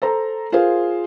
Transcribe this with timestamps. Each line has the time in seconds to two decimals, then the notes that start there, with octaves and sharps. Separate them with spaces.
0.02 A4 C5 A#5
0.52 F4 G#4 A#4 C5 F5